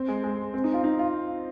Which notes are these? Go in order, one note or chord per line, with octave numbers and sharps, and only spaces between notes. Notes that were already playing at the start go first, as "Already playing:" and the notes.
Already playing: C4
G#3
G#3
C4
D#4
F4
D#4
F4